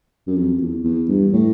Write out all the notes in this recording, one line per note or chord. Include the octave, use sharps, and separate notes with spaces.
F#2
F2
E2
E2
G2
A2